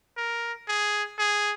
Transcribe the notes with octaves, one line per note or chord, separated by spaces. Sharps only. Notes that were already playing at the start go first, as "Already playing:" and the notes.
A#4
G#4
G#4